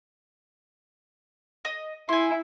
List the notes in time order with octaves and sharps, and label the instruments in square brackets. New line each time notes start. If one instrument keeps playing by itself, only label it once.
[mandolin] D#5
[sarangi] E4 [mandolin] G#5 C6